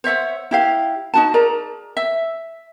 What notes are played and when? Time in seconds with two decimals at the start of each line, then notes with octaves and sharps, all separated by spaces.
0.04 C5 C#5 E5 F#5
0.51 E4 G4 F5
1.14 D#4 F#4 A5
1.34 G#4 A#4 D5 A#5
1.97 E5